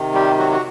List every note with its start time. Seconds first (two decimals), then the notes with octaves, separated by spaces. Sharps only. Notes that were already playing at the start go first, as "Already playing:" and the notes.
Already playing: C3 D#3
0.14 G3 G4
0.39 F#3 F#4
0.52 F#4